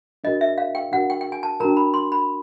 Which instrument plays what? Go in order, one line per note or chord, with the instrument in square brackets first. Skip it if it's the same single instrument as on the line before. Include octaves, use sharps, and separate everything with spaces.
[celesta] D4 F#4 A#4 [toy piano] D#5
[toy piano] E5
F5
G5
[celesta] D4 F#4 A#4 [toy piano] F#5
[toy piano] G5
G5
G#5
A5
[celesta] D4 F#4 A#4 [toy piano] A#5
[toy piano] B5
C6
B5